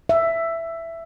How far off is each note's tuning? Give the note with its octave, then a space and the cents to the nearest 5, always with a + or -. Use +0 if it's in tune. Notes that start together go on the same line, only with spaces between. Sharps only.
E5 +10